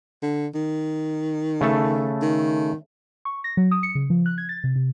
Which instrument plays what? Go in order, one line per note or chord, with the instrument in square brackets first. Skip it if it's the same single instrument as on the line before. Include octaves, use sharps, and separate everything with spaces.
[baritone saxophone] D3
D#3
[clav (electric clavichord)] C#3 A3 A4
[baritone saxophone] D#3
[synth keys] C#6
A#6
F#3
D#6
C#7
C#3
F3
F#6
G#6
A6
C3
C3